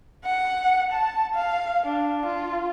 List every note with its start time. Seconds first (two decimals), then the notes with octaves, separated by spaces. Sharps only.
0.24 F#5
0.92 A5
1.34 F5
1.85 D4
2.25 F4